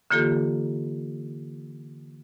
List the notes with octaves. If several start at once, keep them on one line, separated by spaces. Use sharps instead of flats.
D3 E3 A#3 F4 G4 A4